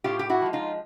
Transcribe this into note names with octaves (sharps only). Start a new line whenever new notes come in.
A2 F4 G4
G4
E4 F#4
F3 G#3
D#4 F4